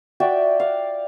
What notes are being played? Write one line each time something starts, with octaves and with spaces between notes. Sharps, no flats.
F#4 D5 E5 G5
F5